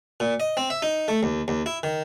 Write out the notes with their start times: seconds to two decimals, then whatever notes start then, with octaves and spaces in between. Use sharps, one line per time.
0.20 A#2
0.40 D#5
0.57 C4
0.70 E5
0.82 D#4
1.08 A3
1.23 D#2
1.48 D#2
1.66 E4
1.83 D#3